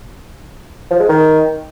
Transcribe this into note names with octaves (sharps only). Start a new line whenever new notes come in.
F3
G#3
D#3